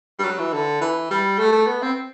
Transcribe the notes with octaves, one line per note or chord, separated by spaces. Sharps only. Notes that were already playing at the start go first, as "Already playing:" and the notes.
G3
F#3
E3
D3
E3
G3
A3
A3
B3
C4